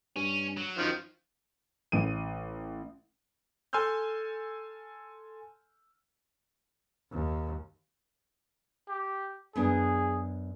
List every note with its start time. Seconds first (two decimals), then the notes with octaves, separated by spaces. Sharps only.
0.16 G2 C#4
0.57 F#3
0.78 F#2 D#3 F3
1.92 A1 D#7
3.73 A4 G#5 C6 E6 F6 G6
7.12 D#2
8.89 G4
9.56 F#2 B3 D4 G#4